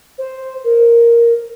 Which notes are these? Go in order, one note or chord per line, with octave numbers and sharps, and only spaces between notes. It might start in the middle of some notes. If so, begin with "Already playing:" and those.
C5
A#4